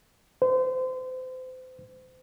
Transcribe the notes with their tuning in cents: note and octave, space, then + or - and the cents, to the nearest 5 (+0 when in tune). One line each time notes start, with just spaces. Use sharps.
C5 -30